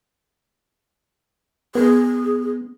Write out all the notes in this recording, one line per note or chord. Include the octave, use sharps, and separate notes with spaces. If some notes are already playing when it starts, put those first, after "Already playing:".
B3 G#4